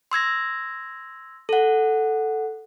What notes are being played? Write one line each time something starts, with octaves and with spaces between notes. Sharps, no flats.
C6 E6 G#6 A#6
A4 F#5